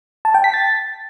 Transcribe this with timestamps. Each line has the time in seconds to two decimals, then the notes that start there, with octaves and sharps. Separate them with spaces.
0.25 A5
0.34 G5
0.44 B6
0.54 A6